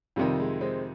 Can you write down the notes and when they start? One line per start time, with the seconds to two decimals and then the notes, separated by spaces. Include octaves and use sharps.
0.16 F2 C3 D#3 G3
0.40 G#3
0.61 G#3 C4